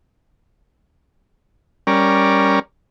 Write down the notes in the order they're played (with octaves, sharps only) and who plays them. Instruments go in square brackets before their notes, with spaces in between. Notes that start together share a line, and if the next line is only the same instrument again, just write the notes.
[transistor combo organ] G3 C#4 A#4 D5